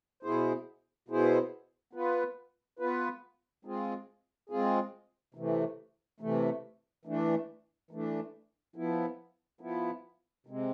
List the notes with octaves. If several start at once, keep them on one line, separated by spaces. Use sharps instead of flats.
B2 B3 E4 G#4 C5
B2 B3 E4 G#4 C5
B3 F4 B4
B3 F4 B4
G#3 C4 F4 G#4
G#3 C4 F4 G#4
C3 E3 A3
C3 E3 A3
E3 A3 D4
E3 A3 D4
F3 B3 E4
F3 B3 E4
C3 G#3 C4